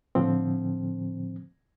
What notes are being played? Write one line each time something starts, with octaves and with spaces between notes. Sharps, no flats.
A2 D3 F3 C4